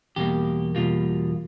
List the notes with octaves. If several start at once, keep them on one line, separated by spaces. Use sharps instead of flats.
E2 B2 G3 A#3 G4
E2 B2 G3 A#3 F4